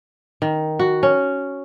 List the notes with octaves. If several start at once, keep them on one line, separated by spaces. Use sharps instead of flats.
D#3
F#4
C#4